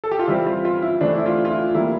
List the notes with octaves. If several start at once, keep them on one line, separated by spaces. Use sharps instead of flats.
A4
G4
F4
E3 G3 C4 E4
F4
F4
E4
E3 A3 C4 D4
E4
F4
F4
E4
E3 G3 A#3 E4